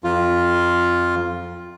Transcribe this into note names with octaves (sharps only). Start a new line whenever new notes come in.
F2 F4